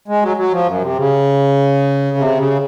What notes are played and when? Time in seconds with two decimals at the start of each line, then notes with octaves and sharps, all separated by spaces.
0.08 G#3
0.22 F#3
0.37 F#3
0.52 F3
0.67 F#2
0.82 C3
0.97 C#3
2.17 C3
2.37 C#3